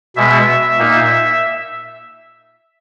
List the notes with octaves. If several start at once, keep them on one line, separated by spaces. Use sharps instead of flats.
B2 G#3 B3 E5
A#2 A#3 D#4